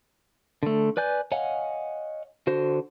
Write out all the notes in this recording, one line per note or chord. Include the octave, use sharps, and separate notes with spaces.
D3 A3
B4 D5 G#5 G6
C#5 D#5 F5 F#5 G#5
D3 F#4 C5